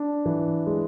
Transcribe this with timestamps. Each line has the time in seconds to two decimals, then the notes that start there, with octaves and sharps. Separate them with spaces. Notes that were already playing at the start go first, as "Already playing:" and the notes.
Already playing: D4
0.26 E3
0.67 G#3